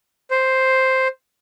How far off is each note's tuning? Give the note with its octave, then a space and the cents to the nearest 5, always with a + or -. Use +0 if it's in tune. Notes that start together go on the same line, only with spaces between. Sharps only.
C5 +0